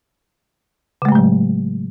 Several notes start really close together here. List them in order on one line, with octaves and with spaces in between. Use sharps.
C#3 G#3 A3 A2 F#3